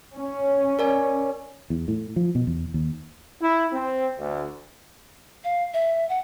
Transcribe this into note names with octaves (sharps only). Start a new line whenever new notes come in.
C#4
A#4 D5 G#5
E2
A2
F3
B2
E2
D#2
E4
C4
D2
F5
E5
F#5